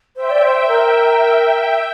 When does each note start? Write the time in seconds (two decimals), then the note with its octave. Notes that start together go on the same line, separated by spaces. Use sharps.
0.16 C5 E5 G5
0.31 D5
0.43 C5
0.68 A#4